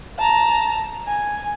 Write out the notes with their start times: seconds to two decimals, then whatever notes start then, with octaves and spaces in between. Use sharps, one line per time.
0.19 A5 A#5
1.07 G#5